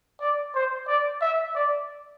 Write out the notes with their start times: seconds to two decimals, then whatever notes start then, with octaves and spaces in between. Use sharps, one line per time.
0.20 D5
0.55 C5
0.87 D5
1.22 E5
1.55 D5